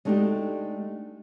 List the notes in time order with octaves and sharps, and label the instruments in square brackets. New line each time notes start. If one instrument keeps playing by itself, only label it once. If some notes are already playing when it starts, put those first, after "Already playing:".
[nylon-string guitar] G#3 A3 D4 D#4 F#4 G4